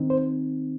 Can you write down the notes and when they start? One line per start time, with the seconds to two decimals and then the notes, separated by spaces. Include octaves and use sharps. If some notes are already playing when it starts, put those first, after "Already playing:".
Already playing: D#3 C4 D#4
0.10 C5